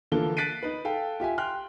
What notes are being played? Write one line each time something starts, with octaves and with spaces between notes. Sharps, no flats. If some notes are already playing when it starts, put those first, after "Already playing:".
D3 E3 F3 A#3 A4 G7
F#6 A6 B6 C7 D7 D#7
D#4 B4
A4 F5 G5
F4 G4 E5 G#5
G5 C6 F6 F#6